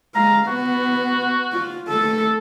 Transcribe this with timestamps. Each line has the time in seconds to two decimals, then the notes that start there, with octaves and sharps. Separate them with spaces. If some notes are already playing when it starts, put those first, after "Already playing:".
0.15 G#3 F5 A#5
0.47 B3 F#4
1.53 F4
1.89 A3 A4